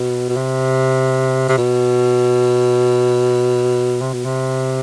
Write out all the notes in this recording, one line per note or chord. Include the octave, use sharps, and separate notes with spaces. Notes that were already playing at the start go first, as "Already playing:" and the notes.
Already playing: B2
B2
C3
C3
B2
C3
B2
C3